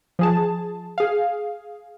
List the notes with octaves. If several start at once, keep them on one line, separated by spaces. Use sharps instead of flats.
F3 G#4 A5
G#4 F5